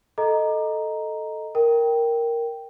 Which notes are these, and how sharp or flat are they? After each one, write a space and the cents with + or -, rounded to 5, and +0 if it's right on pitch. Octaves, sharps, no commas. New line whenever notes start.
A4 +0 D#5 +0 A#5 +0
A#4 +0 G5 +0